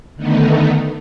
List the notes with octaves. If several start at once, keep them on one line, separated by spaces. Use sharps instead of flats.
D3 D#3 A3 B3 D#4